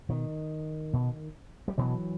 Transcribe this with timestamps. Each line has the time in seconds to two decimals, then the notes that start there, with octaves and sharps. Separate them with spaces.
0.09 B2 D#3
0.93 B2
1.68 G3
1.78 B2 E3 F#3